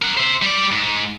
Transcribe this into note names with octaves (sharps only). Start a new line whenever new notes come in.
A#4 F#5
C5 E5
G3 D5
G#2